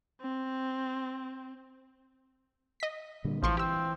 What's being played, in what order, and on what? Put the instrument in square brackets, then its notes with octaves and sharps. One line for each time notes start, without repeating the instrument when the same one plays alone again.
[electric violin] C4
[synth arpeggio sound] D#5 B6
[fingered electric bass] A#2 D3 G3
[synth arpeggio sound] A1 C6 C#6 [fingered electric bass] E3 [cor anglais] F3
[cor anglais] C4 [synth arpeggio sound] G4 E6